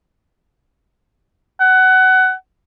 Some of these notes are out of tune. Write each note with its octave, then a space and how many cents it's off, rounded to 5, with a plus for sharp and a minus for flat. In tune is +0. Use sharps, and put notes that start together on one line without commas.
F#5 +20